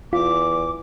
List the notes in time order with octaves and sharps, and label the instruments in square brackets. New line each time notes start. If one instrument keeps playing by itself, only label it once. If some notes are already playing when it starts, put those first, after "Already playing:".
[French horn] E2 [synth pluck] F4 [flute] D6